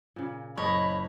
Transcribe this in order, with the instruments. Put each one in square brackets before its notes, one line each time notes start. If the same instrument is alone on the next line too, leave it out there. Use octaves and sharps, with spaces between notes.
[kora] A#2 C#3
[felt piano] F#1 A#6 [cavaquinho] C#5 D#5 [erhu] B5